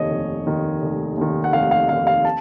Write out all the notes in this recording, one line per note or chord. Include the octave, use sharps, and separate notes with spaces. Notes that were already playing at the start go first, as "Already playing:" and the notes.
Already playing: F1 D#2 D#3 C#5 D#5
F1
D#2 D#3
F1
D#2 D#3
F#5
F1 F5
F5
D#2 D#3 F5
F5
A5